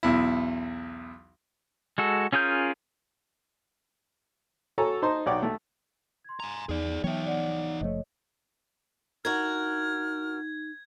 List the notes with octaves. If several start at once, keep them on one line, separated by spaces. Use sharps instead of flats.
B1 E2 E4
G#3 F#4 A4
C#4 F4 G#4 A#4 G6
F#4 A4 C#5 G#5 A#5 C#6
D#4 C5 D#5 A5 C6
B1 C#5 D5 F#5 G5 D6
A3
C6 G#6
G#5 A#5
E2 D#4 G#4 D5
E3 F#3 B3 D#4 C#5 E5 G5
D5 F#5
F#1 F3 A3 C#5 D#5
D2 D#4 F#4 A#4 F6 G#6